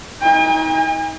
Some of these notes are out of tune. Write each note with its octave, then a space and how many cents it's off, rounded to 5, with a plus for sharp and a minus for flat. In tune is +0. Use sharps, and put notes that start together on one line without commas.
D#4 +35 G#5 -45